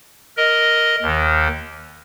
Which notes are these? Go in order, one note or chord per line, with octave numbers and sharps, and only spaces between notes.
A#4 D#5
D#2 D#3